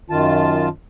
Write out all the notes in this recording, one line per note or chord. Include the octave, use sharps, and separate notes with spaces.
F#2 D#3 F4 A5